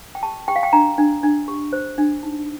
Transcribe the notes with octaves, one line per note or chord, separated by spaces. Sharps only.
G5
G4 A5
G4 G5
F5
G5
D4 A#5
D4
D4
G4
C5
D4
D#4